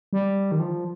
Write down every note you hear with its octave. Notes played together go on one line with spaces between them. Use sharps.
G3
D#3
F3